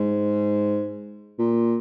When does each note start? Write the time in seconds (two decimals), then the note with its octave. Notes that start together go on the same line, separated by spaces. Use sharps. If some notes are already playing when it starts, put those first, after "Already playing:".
Already playing: G#2
1.39 A#2